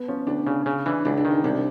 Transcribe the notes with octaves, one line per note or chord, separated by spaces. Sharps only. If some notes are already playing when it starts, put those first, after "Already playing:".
Already playing: B3
F3 C#4
D2 D4
C#3 D4
C#3
E3 D4
C#2 D4
D4
D#3
D#4
C2 D4